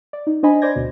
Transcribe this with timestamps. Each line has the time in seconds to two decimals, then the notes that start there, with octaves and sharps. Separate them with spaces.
0.13 D5
0.27 D#4
0.43 D4 C5 D#5 G#5 B5
0.62 C5 D5 D6 G6 G#6 A#6
0.76 D2 B2